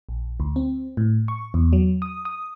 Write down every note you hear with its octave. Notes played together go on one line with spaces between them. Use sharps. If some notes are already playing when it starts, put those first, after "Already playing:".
A#1
D2
C4
A2
C#6
E2
F#3
D#6
D#6